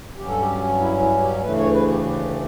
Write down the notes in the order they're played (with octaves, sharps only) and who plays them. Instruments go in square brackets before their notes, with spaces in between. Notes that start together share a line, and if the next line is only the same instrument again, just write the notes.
[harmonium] G2 F#3 C#4 G4
A4
G4
E4
E4
G4
D2 C#3 E3 A3 B4
C#5
B4
G4
G4